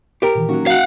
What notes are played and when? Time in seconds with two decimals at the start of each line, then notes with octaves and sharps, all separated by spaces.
0.22 G4 A#4
0.35 A#2 D#3 E3
0.49 F#3 A#3 C#4 D#4 F#4
0.67 F5 F#5